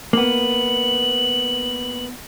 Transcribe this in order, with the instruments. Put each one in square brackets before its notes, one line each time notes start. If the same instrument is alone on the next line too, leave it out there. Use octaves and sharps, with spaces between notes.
[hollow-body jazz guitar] A#3 B3 [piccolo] F#7